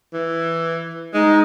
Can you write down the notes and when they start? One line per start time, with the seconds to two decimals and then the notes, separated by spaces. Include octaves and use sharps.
0.13 E3
1.14 G#3 D#4